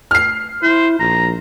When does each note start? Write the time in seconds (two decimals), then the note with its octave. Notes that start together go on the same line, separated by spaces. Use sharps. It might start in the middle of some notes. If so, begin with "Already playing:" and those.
0.11 F6 C7
0.62 E4 C5
1.00 A#1 A#5